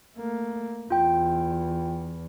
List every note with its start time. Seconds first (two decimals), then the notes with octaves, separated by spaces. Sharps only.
0.16 A3 A#3
0.90 E2 F4 G5